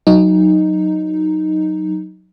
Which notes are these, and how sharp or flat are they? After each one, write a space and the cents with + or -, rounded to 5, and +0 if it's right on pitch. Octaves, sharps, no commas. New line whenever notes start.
F#3 +0 D#4 +0